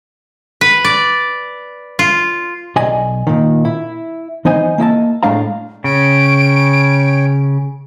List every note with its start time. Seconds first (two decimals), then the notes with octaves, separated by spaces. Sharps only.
0.61 B4
0.85 D5
1.99 F4
2.76 B1 D5 D#5 G#5
3.27 A#2 D#3
3.65 E4
4.45 E3 B3 D#4 C5 D#5 G#5
4.78 A#3 E4 D#5 A5
5.23 A2 G#3 D4 F5 A#5
5.84 C#3 C#4 C#5 G5 D7